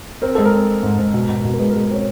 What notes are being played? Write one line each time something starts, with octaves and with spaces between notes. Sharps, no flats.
C4 A#4
G#3 A4
A#4
C4
C4
G#2
G#2
B2
B2
B2
A#4
G#3 B4
G#3 A#4
C4 C#5